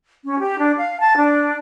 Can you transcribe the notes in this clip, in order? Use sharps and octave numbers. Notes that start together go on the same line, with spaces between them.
C#4
G4
D4
F5
A5
D4